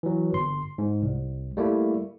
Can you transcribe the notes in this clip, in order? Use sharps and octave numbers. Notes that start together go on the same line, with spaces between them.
E3 F#3
G1 C6
G#2
C2
G3 A3 A#3 E4